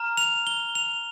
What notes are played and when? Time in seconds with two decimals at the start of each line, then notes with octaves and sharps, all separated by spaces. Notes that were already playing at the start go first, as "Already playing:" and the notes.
Already playing: A#5 F6
0.17 F7
0.47 G7
0.75 F7